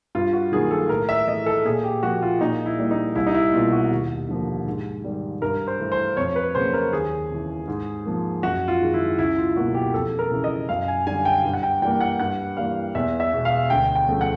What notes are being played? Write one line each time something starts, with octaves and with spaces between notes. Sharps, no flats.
G2 F4
F#4
D#3 F#3 A#3 G#4
A4
A2 A#4
E5
E3 A3 D#5
A4
A#2 G#4
G4
F3 A#3 F#4
F4
A#2 D#4
E4
G3 A#3
D#4
C2 E4
D#4
E4
B2 G3 A#3 F4
F#4
D#2
D3 F3 A#3
G#2
D#3 G3
G2 A#4
C5
E3 A3
C5
F2 C#5
B4
C#3 F#3 A#3 C5
A#4
D#2 G#4
C#3 E3
G#2
F3 A#3
F#2 F#4
F4
D#3 G#3
E4
C#2 E4
F4
B2 F#3 A#3 F#4
G4
F2 A4
A#4
C#3 E3
D#5
F#2 F5
G#5
D3 G3 G#5
G5
G2
F#5
G5
E3 G3 A#3 G5
F#5
G2 F#5
E3 G3 A#3 F5
E2 E5
E5
B2 G#3
F5
D2 G5
G5
C#3 F3 A3
F#5